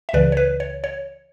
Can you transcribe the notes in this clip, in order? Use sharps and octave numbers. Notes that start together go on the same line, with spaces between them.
E5
C#2 C#3 E3 B4 D5
C#5
B4
C#5
C#5